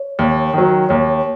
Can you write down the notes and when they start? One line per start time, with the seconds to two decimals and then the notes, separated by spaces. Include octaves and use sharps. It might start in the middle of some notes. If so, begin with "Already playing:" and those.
Already playing: C#5
0.19 D#2
0.53 D#3 F#3
0.89 D#2 C#5